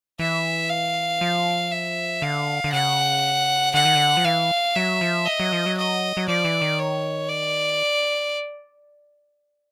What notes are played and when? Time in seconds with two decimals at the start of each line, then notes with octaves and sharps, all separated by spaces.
0.19 E3 E5
0.69 F5
1.21 F3
1.71 E5
2.22 D3 F5
2.64 D3
2.72 C#3 F#5
3.74 D3 F#5
3.85 D#3
3.95 D3
4.17 F3
4.24 E3 F5
4.75 F#3 E5
5.01 F3
5.26 D#5
5.40 F#3
5.53 F3
5.66 F#3
5.77 D#5
6.17 F#3
6.28 F3 D5
6.44 E3
6.62 D#3
6.79 C#5
7.29 D5